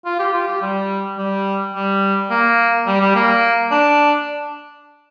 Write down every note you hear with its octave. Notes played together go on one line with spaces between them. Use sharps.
F4
G4
F4
G4
G3
G3
G3
A#3
G3
G3
A#3
D4